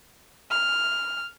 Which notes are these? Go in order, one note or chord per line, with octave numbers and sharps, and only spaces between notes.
F6